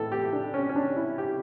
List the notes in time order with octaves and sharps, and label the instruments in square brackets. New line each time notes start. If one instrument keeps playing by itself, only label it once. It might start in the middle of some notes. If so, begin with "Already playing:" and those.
Already playing: [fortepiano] A2 E3 A4
G4
D4
C#4
C#4
D4
E4
G4